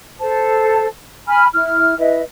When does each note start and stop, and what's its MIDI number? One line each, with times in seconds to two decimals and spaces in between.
0.20 0.87 69
0.20 0.87 72
0.20 0.87 81
1.28 1.46 80
1.28 1.46 83
1.28 1.46 89
1.54 1.97 64
1.54 1.97 89
1.98 2.22 64
1.98 2.22 71
1.98 2.22 75
1.98 2.22 76